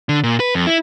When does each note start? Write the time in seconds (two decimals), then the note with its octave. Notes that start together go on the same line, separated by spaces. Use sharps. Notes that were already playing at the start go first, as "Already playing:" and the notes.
0.09 D3
0.24 A#2
0.40 B4
0.55 F2
0.67 E4